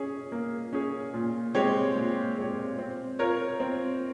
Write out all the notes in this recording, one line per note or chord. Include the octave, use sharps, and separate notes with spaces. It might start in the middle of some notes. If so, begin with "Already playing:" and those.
Already playing: C#4 G#4
A#3
C#4 G#4
A#2
G#3 C4 G4 C#5
A#2
G#3 C4 G4 C#5
C4
F4 A#4 C#5
C4